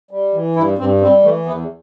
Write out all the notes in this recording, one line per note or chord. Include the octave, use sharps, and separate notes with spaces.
G3
E3
G2 E4
G2 C4
G3 C4
E3 A3
E2 B3